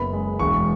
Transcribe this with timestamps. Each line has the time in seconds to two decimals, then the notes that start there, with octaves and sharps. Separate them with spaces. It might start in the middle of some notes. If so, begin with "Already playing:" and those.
Already playing: F#1 B3 B5
0.13 G#3
0.39 E1 C#6